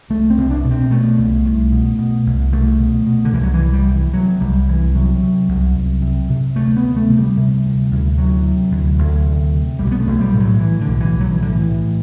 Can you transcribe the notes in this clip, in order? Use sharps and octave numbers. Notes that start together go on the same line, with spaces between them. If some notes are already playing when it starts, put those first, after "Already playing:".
C2 A3
C4
C2
D4
B2
C4
B2 A3
C2
C2
B2
B2
C2
C2 A3
B2
B2
D3
C2 E3
F#3
E3
C2
G3
C3
E3
C3 F#3
C2 G3
C2 E3
C3 F#3
C3
C2
C2
C3
C3
D2 A3
B3
D2
A3
C3
G3
C3
D2
D2
C3 F#3
C3
D2
D2
C3
C3
B1 G3
B3
A3
B1
G3
A2
F#3
A2 E3
D3
B1
E3
B1
F#3
E3
A2 D3
E3
A2